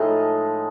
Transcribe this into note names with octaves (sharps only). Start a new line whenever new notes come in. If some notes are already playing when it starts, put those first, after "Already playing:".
Already playing: A2 F3 G#3 D#4 D#5